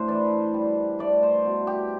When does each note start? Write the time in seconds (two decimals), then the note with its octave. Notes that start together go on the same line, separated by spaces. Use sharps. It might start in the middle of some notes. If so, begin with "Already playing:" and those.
Already playing: A2 D4 C5
0.08 E3 D5
0.54 G3
0.99 A3 D5
1.23 C5
1.45 B2
1.67 G4